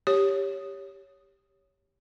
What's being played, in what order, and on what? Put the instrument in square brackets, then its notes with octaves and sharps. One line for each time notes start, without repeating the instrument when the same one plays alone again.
[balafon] G4 C#5